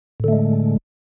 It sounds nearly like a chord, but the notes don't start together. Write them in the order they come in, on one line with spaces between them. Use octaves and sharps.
A2 D3 A3 G#3